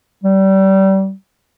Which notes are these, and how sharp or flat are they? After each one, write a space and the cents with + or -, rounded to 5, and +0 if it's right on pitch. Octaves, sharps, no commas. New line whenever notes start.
G3 -30